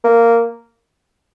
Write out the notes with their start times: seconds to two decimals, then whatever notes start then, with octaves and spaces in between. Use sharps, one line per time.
0.04 A#3